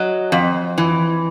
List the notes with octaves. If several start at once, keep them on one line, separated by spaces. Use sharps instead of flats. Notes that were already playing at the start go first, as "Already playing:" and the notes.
Already playing: F#3 D#5
F2
E3